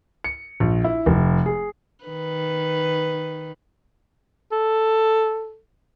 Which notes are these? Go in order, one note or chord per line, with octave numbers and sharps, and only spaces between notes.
C#7
A#1
E4
F1
G#4
D#3 B4
A4